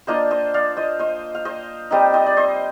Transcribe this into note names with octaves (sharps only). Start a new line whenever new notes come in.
A#3 D4 F4 C5 D#5
C5 D#5
D5 F5
C5 D#5
C5 D#5
F5
C5 D#5
G3 C4 D#4 C5 D#5
C5 D#5
D5
C5 D#5